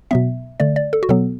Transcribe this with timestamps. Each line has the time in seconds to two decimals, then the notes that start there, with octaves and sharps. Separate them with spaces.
0.11 B2 F#3 B3 E5
0.60 D3 A3 D5
0.76 D5
0.93 A4
1.03 F#4
1.09 B2 F#3 B3 A4